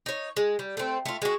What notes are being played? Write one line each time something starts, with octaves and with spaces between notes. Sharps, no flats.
D#4 C#5
G#3
G3
A3 C4
A3 F4
G#3 F#4